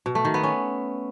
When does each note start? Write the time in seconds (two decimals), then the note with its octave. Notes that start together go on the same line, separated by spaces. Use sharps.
0.06 B2
0.15 A3
0.25 D#3
0.34 B3
0.44 C#4